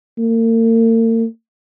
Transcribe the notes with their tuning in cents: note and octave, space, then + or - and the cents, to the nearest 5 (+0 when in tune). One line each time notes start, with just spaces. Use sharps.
A#3 -45